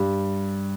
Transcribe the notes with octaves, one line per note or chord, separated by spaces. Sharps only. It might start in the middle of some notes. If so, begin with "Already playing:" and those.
Already playing: G2 G3